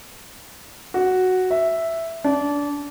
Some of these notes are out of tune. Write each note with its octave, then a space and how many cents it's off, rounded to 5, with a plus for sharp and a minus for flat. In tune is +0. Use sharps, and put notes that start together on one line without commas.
F#4 +0
E5 +0
D4 -25